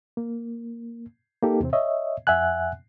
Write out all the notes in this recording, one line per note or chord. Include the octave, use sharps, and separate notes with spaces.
A#3
A#3 D#4 G4 A4
E2 C3 C4
C#5 D#5 E5
F2 E5 F#5 G#5 F#6